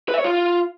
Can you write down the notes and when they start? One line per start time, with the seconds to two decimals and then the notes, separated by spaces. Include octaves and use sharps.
0.09 B4
0.14 E5
0.19 C#5
0.24 F4